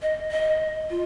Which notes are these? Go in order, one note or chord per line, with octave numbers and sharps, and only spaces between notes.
D#5
D#5
F4